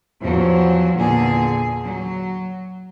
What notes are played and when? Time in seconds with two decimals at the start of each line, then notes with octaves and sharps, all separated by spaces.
0.22 E2 F3 F#3
0.98 E2 A#2 D3 G#4
1.85 F#3